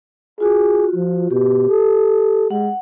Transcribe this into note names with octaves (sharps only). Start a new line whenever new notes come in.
F4 F#4 G#4
F3
B2 G4
A4
G#3 F#5